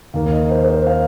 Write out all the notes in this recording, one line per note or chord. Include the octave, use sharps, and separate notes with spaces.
D#2 D#3 A#3 F5
D#5
C5
A#4
C5
F5